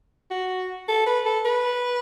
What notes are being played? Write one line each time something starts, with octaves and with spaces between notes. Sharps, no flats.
F#4
A4
B4
A4
B4